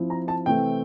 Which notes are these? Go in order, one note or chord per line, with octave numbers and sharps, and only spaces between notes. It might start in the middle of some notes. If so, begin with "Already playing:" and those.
Already playing: F3 C4 E4
A#5
A5
C3 E3 A3 C4 G5